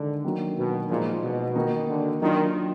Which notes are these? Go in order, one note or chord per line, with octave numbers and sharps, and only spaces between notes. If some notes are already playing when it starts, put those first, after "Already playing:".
Already playing: D3 D#3 G#3 D4
D#3 F#3 A#3 D4 F#4
B2
A#2 F3 G#3 D#4 F#4
B2
D#3 A#3 D#4 F#4
D3
D#3 F#3 D4 F4